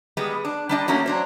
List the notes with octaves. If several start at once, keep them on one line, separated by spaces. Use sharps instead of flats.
G3 G#3 B3
D4
G3 D4 D#5
A3 A#3 C#4 F#4
F#3 D4 C5